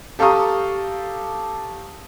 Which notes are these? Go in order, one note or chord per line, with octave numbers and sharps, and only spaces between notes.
G4 A4 F5 A#5 C#6 D#6